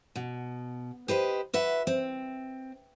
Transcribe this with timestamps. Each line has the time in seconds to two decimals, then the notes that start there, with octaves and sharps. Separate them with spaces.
0.16 B2
1.08 G4 B4 C5 D#5
1.53 F#4 B4 E5
1.87 C4